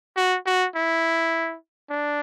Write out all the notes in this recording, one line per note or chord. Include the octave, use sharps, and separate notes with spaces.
F#4
F#4
E4
D4